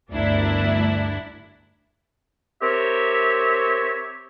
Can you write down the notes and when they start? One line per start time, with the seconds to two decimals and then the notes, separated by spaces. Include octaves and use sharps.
0.10 G1 D2 D4 E4 A#4
2.61 C4 G4 A#4 C#5 E5